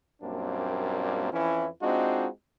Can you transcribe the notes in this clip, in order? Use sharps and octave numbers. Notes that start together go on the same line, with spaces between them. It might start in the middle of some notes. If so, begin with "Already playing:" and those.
F#2 A#2 G3 A#3 C4 D4
F2 E3 C#4 E4
G#3 C4 D4 D#4 F4 F#4